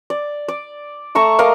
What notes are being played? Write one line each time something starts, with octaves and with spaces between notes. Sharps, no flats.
D5
D5
A3 A#5 C#6 E6
A#4 D#5 F5 D6